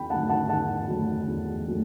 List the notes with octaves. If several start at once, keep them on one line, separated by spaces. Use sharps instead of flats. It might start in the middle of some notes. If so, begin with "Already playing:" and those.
Already playing: E2 G5 B5
D3 F#3 A3 F#5 A5
F#5 A5
E2 F#5 A5
D3 F#3 A3
E2
F#3 A3